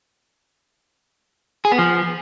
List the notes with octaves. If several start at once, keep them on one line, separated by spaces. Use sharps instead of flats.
G#4
B3
F3